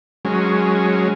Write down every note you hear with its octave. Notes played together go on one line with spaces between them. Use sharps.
F#3 G#3 C#4